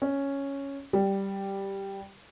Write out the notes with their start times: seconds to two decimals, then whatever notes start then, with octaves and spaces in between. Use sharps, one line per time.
0.02 C#4
0.93 G3